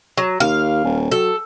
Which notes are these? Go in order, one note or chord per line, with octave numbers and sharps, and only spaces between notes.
F#3
D#2 F5
D#1
F#3 A4